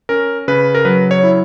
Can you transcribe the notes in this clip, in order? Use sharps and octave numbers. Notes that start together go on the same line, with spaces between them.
C#4 A#4
C#3 B4
A#4
F#3 B4
C#5
E4